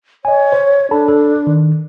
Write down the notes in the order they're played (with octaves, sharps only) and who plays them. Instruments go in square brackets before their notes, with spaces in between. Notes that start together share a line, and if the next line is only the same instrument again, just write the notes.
[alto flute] C#5 [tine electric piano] D#5 G#5
[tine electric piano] C5
[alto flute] D4 [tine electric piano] A4 A5 B5
[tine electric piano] A4
D#3